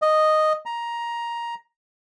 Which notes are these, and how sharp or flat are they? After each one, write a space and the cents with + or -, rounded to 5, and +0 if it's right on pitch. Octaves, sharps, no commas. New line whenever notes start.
D#5 -5
A#5 +10